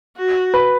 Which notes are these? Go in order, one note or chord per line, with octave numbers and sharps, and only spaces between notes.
F#4
B4